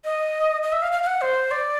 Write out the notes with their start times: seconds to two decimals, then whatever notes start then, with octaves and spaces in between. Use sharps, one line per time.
0.05 D#5
0.63 D#5
0.72 E5
0.82 F5
0.92 F5
1.03 F5
1.07 F#5
1.21 C5
1.51 D5